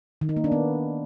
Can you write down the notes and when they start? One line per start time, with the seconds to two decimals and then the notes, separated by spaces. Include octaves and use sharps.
0.21 D#3
0.29 D#4
0.37 A#3
0.44 D4
0.52 B3